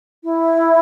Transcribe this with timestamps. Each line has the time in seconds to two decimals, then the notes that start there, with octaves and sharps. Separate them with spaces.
0.24 E4